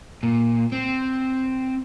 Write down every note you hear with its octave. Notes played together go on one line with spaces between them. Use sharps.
A#2
C4